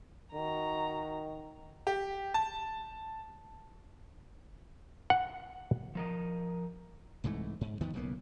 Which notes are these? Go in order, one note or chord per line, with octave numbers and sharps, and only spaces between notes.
D#3 F#4 A#5
G4
A5
F#5
F3 A#4 D#5
C2 G#2 E3 A3
G#2
E2 D#3 F3 B3
B1 C#3 A#3 B3